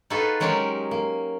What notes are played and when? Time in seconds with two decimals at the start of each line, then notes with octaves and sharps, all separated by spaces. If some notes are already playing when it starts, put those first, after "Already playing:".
0.10 D#4 F4 F#4 G#4 A4 B4
0.40 F#3 G#3 C#4 D#4 G4 A#4
0.91 A#3